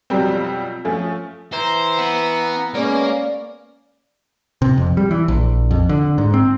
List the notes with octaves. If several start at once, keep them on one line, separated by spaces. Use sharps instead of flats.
F2 B2 F#3 G3 C4
F3 A3 C#4
E3 C5 A#5
B3
G#3 A#3 B3 C#4 D5
C3
F2
G3
E3
A#1
F2
D3
G#2
C4